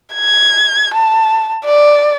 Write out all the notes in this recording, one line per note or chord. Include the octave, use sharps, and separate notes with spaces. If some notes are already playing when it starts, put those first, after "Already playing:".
G#6
A5
D5